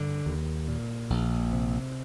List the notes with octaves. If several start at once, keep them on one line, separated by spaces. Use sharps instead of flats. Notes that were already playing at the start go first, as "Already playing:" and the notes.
Already playing: G2 D3
D#2
A#2
A#1
C3